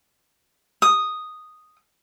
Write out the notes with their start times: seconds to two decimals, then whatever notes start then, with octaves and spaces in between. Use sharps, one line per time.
0.82 D#6